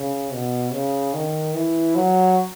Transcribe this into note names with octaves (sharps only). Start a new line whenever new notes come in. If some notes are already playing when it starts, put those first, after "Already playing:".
Already playing: C#3
B2
C#3
D#3
E3
F#3